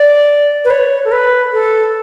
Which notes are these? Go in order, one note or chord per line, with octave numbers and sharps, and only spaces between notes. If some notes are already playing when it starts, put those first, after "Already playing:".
Already playing: D5
B4
C#5
A4
B4
A4